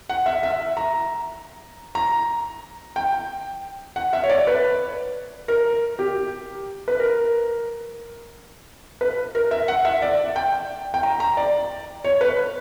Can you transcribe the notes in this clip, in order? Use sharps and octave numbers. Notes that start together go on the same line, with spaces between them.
F#5
E5
E5
A#5
A#5
G5
F#5
E5
C#5
D5
B4
A#4
G4
B4
A#4
B4
A#4
E5
F#5
E5
D5
G5
G5
A#5
A#5
D5
C#5
B4